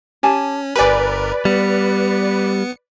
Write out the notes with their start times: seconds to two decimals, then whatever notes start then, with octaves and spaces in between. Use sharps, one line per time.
0.23 C#4 G4 G#5 A5
0.76 G1 G4 A#4 B4 D5 G#5
1.45 G3 B3 C#7